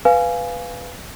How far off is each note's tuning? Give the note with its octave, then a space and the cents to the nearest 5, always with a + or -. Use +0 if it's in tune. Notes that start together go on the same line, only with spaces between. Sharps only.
B4 +0 F5 +0 G#5 +0